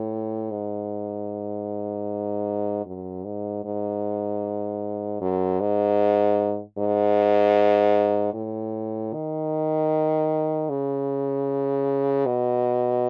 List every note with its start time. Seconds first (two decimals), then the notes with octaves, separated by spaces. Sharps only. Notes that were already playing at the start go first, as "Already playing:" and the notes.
Already playing: A2
0.51 G#2
2.86 F#2
3.25 G#2
3.64 G#2
5.21 F#2
5.60 G#2
6.78 G#2
8.34 A2
9.13 D#3
10.69 C#3
12.26 B2